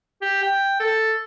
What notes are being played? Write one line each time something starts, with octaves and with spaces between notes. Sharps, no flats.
G4
G5
A4